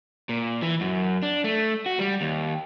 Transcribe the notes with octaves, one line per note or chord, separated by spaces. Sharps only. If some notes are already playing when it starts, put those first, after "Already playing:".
A#2
E3
F#2
D4
A3
F#4
G3
D#2